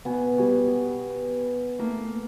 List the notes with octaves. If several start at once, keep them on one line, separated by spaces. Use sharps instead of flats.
B2 B3 G#5
B2 G3 G#5
A3 A#3